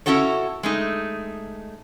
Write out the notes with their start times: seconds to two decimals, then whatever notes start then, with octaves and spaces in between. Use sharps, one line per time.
0.06 C#4 E4 F#4 A4 C#5
0.63 G#3 A3 D#4